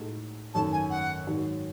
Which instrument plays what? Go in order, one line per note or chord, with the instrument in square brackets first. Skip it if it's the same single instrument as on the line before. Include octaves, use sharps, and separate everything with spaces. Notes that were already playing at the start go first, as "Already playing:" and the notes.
Already playing: [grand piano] A2 G#3 D#4 F#4 A4
[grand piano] G#1 F#2 D#3 A3 C#4 [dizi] A5
[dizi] G#5
F#5
[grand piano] G#2 D#3 F#3